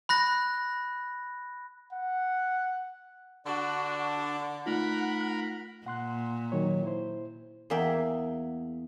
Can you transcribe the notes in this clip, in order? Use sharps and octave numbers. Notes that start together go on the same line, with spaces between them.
B5 F#6 A#6
F#5
D3 D4 F#4
A3 D#4 F4 A#4 F#5 B5
A#2 F#5 C6 F#6
D#3 F#3 C#5
E4 C5
E2 A#3 G#4 E5 G5